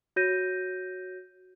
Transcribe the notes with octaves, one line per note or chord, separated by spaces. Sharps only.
F#4 C#5 G6 A#6 D#7